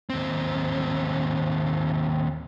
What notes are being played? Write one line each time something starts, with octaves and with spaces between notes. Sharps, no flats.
D#2 C4